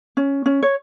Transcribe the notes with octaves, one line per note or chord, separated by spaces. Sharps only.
C#4
C#4
C#5